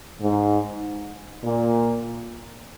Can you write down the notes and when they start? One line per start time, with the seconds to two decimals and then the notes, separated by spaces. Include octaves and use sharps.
0.21 G#2
1.44 A#2